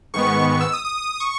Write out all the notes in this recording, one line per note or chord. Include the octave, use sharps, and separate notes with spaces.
G#2 D#3 G#3 B3 C#6
C#6
E6
D#6
D#6
C#6